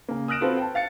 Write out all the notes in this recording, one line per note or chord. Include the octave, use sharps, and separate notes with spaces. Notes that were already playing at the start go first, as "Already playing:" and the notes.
C#3 A#3
D#6 F6 F#6 A#6 D7 E7
C4 F4 F#4 A4 B4 C5
G5 A5
F5 A6 C#7